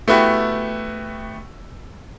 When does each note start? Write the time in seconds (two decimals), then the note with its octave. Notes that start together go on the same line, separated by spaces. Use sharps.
0.08 A3 B3 E4 F#4 G4